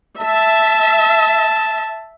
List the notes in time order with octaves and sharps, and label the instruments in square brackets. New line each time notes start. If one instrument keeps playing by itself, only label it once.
[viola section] E5 [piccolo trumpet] A5